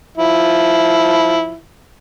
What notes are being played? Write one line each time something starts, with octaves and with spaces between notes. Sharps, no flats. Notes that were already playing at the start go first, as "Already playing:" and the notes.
F3 E4